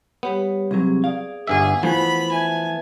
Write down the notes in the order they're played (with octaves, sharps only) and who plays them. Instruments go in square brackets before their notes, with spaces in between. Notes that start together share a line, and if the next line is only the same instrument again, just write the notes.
[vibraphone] G3 G4 C#5 [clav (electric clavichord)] B3
[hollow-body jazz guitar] C2 F#3 [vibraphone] C4 G4 G#4
[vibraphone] G#4 D5 D#6 [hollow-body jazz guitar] F5
[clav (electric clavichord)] G1 G2 E5 [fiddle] G#4 [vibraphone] F#5
[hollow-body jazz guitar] E3 A3 B3 [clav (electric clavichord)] F3 [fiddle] B5
[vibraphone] E5 A5 [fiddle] G#5